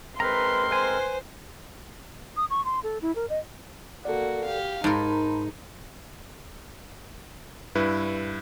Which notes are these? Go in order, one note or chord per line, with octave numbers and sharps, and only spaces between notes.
G#3 C4 A#4 B4 A#5 C6
B4 C5 G#5
D#6
C#6
C6
A4
E4
A#4
D#5
A#3 F#4 A4 D5
G4 F5
G#2 D#4 A#4 A5 B5 C6
G2 E4 B4